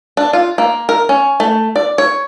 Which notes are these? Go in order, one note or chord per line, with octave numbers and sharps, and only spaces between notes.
D4
F4
A#3
A#4
C#4
A3
D5
C#5